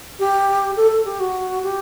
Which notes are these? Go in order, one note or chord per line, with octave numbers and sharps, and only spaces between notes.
G4
A4
A4
G4
F#4
G4